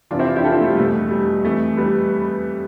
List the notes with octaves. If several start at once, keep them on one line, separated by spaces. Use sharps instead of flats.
F2 C3 E3 D4 F4
C4 E4
D4 F4
E4 G4
F4 A4
C4 E4
A3
G3
E2 B2 A3
G3
F2 E3 A3
G3 B3